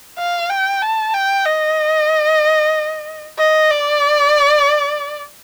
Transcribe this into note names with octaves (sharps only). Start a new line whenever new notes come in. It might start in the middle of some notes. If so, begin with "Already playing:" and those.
F5
G5
A5
G5
D#5
D#5
D5